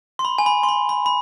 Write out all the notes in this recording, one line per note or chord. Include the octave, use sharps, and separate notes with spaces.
C6
B5
G#5
B5
C6
B5
B5
B5